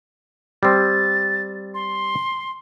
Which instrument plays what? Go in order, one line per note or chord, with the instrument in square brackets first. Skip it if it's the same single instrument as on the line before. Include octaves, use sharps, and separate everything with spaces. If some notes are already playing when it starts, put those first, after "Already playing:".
[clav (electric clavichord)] G3 C4 [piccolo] A6
[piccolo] C6